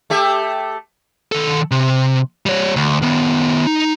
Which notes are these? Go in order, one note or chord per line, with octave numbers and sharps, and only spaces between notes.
A3 G4 E5
D#3 A4
C3
G3 C#5
D2
D#3 B3
D#4